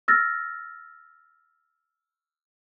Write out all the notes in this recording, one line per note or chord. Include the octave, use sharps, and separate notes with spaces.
E6 F6 A6 A#6